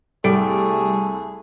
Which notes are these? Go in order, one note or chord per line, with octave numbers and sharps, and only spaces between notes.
C2 G3 A3 G#4 A4 D7